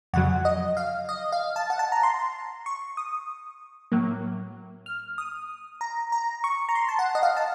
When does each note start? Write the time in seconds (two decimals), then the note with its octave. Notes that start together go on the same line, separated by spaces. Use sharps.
0.13 F2 C#3 F#3 F#5
0.45 D#5
0.77 F5
1.09 D#5
1.32 F5
1.56 A5
1.70 F#5
1.79 A5
1.92 A#5
2.03 C6
2.66 C#6
2.97 D#6
3.92 A2 F#3 A#3
4.86 F6
5.18 D#6
5.81 A#5
6.12 A#5
6.44 C#6
6.69 A#5
6.75 C6
6.89 A5
6.99 F#5
7.15 D#5
7.23 F5
7.37 A5